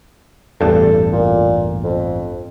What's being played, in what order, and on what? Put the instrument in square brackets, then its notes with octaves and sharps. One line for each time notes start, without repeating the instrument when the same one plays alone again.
[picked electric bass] A1 E2 G2 [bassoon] A4
[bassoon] A#2
F2